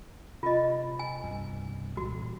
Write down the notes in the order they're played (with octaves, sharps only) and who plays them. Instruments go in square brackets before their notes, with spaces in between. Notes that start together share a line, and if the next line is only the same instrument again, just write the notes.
[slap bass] C3 [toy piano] F4 D#5
[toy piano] G#5
[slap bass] C2 G2 B2
[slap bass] A#2 E3 G3 [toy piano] F#4